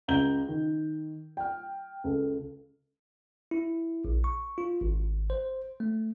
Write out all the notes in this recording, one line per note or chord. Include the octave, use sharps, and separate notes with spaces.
C#2 A#5 G6 G7
D#3
G5 F6
C#2 A4
E4
A#1
C#6
F4
G#1
C5
A3